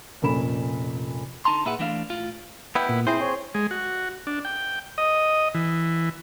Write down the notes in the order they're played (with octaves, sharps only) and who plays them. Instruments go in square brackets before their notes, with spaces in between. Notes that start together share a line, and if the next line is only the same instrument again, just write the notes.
[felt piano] F1 A#2 C#4 A4 B5 E7
[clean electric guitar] D3 D#4 A5 A#5 C6
A#2 E4 G#4 B4 F#5
E3 A3 D4 E5 F5
A2 F4
[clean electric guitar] B3 E4 [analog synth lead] G5
[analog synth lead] A#2
[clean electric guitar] C4 G#4 C5 [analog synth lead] E4
[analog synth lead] C#5
[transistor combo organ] G#3
F#4
D4
G5
D#5
E3